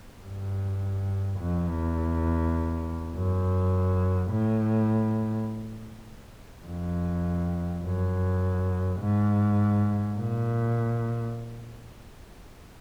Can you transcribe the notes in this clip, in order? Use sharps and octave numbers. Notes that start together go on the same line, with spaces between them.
G2
F2
E2
F#2
A2
F2
F#2
G#2
A#2